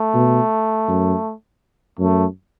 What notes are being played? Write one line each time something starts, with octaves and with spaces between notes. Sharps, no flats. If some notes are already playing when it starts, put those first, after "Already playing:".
Already playing: A3
B2
F#2
F#2 A3